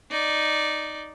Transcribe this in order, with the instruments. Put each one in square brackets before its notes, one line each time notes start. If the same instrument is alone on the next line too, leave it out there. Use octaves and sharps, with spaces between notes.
[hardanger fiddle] D#4 D5